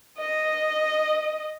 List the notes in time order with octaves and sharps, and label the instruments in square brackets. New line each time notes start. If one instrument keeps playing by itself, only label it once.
[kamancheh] D#5